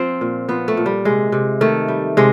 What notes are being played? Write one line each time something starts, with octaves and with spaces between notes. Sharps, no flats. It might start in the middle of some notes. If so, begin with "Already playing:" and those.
Already playing: F3 C4
A#2
F3 B3
A3
A#2
G3
C3 G#3
C3
D#3 A3
G3
C3 G#3